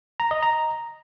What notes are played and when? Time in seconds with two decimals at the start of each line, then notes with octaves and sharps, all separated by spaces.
0.20 A#5
0.31 D#5
0.42 A#5